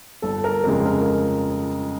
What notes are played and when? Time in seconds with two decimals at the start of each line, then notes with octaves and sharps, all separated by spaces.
0.22 G1 A4
0.44 A#4
0.64 F2 C#3 F3 G#3 A#4
0.86 A#4